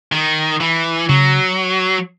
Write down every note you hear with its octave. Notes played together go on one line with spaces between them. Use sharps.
D#3
E3
C#3 F#3